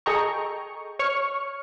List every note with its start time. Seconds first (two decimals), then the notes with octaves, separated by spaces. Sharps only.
0.06 G#4 A4 D#5 G5 A#5 C#6
0.99 C#5 C#6 F6